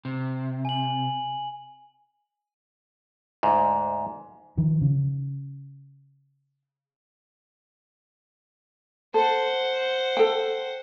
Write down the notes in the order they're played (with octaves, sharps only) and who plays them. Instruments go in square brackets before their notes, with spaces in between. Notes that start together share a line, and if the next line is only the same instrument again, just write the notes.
[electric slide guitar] C3
[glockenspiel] G#5 F#7
[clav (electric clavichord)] D2 G#2
[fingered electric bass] D#3 F3
C#3
[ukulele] A4 [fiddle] C5 F#5
[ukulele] A4 G5